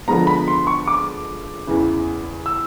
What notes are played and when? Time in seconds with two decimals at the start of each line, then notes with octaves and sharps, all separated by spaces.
0.08 D3 F3 G#3 B3 A#5
0.27 B5
0.48 C6
0.67 C#6
0.87 D6
1.67 E2 C#3 E3
2.46 E6